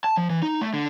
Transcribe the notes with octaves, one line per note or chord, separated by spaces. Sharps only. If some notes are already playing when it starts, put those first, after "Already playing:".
A5
F3
E3
D#4
A3
D3